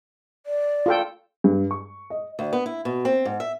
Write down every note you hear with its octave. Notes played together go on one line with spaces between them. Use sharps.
D5
F4 A4 G5
G2
C#6
D#5
D2
B3
E4
B2
C4
G#2
E5